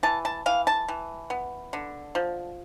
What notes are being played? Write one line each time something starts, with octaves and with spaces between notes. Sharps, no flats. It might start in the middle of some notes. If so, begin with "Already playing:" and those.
E3 A5
A5
E3 F5
A5
E3
B3
D3
F3